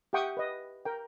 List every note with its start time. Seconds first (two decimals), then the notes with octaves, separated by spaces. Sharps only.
0.13 G4 E5 F#5 G5 C#6 D#6
0.37 B4 D#5
0.85 A#4 G5